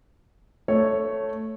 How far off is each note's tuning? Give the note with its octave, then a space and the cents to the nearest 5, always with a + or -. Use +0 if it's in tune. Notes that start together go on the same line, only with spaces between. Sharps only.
A3 +0 C#5 +0